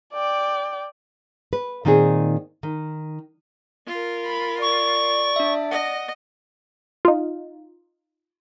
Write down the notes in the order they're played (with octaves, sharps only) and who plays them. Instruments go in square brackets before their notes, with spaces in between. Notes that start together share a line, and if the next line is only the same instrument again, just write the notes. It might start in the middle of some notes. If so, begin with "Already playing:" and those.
[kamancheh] D5 G5
[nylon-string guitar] B4
A#2 D#3 C4 D#4 G#4
D#3
[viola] F4 A#4
[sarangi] B5
[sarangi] D5 [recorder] C#6
[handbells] D4 E5
[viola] D#5 [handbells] F#5 A#6
[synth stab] D#4 F4